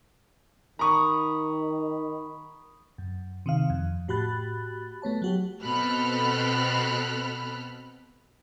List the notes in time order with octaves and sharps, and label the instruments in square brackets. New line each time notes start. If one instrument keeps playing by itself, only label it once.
[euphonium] D#3 [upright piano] A#5 C#6 [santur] B5 D#6
[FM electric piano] F#2
C3 D#3 F5
F2
A2 F#4 G4 B5 F#6 A6
A3 B3 C#5 A5
F#3 F#4 G4
[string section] B2 C4 A4 B5 F6 F#6